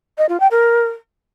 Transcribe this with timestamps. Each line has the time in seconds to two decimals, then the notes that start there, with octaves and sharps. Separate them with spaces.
0.18 D#5
0.29 F4
0.40 G5
0.51 A#4